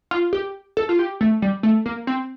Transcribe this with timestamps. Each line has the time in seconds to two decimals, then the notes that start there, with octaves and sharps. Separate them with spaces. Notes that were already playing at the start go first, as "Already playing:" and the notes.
0.11 F4
0.33 G4
0.77 A4
0.89 F4
0.99 G4
1.21 A3
1.42 G3
1.63 A3
1.86 A#3
2.07 C4